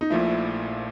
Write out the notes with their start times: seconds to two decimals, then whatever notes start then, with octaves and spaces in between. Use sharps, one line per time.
0.01 D#4
0.10 A#1 A#2 F3 A3 E4